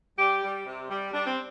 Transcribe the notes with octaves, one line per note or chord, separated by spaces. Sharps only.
G3 G4
G3
C3
G3
G3 D4
C4